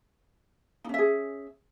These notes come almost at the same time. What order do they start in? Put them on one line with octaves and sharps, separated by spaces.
D#4 C#4 E5 G#4